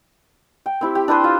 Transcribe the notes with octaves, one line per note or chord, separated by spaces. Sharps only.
G5
C4 E4 G4
G4
D4 E4 B4 C5
F4